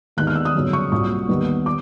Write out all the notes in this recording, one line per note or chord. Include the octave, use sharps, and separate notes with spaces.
D#2 D#3 G#3 B3 F#6
F6
E6
D#6
G1 F#2 C#3
C#6
C2 A#2 F#3 C#6
D#2 D#3 G3 B3
D6